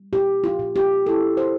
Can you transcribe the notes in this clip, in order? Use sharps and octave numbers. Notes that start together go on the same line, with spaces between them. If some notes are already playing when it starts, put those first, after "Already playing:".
Already playing: G3
A#2 G4
F4
A#2
G4
E4 A4
C5